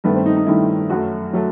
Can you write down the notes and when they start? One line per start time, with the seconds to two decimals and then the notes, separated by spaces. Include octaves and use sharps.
0.04 G2 D#3 A3 B3
0.15 C4
0.26 D#4
0.36 D#4
0.46 G2 D#3 A3 E4
0.90 F#2 F#3 A3 F#4
1.33 F#3 A3